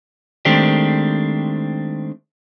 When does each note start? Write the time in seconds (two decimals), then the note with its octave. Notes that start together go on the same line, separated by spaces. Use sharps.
0.45 D#3 G#3 A3 C4 D4 G4